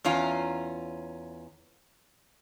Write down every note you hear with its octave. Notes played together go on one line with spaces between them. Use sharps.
E2 C#4 F4 A#5